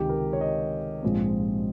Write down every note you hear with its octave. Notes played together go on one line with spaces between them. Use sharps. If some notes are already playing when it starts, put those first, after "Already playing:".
Already playing: C#2 C3 D#3 G4
A#4
C#5
D#5
A#1 G#2 F3 G#3 C4